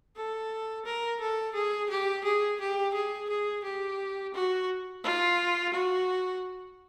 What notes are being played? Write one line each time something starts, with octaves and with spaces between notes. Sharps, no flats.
A4
A#4
A4
G#4
G4
G#4
G4
G#4
G#4
G4
F#4
F4
F#4